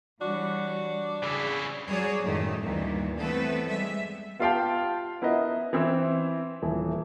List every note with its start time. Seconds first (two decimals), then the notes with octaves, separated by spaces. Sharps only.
0.21 E3 G3 D4 F#4 C#5
1.23 C#3 E4 G#4
1.88 F#3 G3 F#4 G#4 C#5 D5
2.23 F#2 A2 D#3 G3 A3
2.62 D2 G2 A#2 D#3 E3 G3
3.17 E3 A3 B3 C4 A4 B4
3.69 G3 G#3 E5
4.39 B3 F4 G4 F5 G5 A5
5.22 B3 E4 A#4 B4 D#5 E5
5.73 E3 C4 E4
6.62 D#1 E3